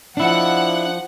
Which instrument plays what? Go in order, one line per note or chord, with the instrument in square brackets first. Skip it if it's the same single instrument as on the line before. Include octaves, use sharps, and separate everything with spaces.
[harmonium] F3 [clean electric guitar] D4 E4 [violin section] F#5